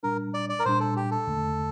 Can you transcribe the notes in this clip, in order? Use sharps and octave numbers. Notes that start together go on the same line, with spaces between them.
A#2 G3 D4 A#4
D5
D5
A#4
A#2 G3 D4 C5
A4
G4
A4
E2 D3 A3